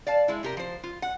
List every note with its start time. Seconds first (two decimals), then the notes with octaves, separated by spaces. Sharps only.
0.07 D5 F5 A5
0.28 G#3 E4
0.43 C3 G4 A#4
0.57 F3 C5
0.84 F4
1.02 F#5